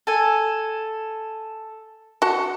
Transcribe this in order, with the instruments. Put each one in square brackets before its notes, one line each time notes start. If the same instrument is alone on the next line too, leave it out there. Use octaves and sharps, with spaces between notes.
[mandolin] A4 G#5
[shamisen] F#4 A5 [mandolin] F#5